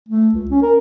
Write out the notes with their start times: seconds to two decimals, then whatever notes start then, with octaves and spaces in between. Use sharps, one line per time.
0.09 A3
0.35 C#2
0.51 C#4
0.63 A#4